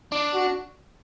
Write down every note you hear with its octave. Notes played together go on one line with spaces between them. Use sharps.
D4
F#4